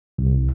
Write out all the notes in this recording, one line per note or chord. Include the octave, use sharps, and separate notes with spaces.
C2